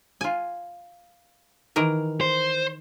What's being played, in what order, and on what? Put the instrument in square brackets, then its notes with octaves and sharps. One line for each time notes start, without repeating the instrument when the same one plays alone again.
[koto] F4 G#5
D#3 E3 A#4
[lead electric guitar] C5